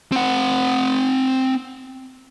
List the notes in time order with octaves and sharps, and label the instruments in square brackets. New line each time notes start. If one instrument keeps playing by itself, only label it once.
[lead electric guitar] C4 F#5